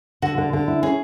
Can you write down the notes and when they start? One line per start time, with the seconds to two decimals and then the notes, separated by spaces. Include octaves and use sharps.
0.22 D3 F#4
0.38 D3
0.53 D3
0.68 E4
0.83 C#4 G#4